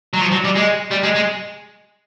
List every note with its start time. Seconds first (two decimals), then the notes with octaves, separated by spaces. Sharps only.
0.13 F#3
0.21 F3
0.32 F#3
0.44 G3
0.55 G#3
0.91 G3
1.03 G#3
1.15 G#3